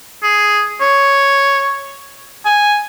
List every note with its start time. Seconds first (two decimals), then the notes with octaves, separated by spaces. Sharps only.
0.23 G#4
0.80 C#5
2.45 G#5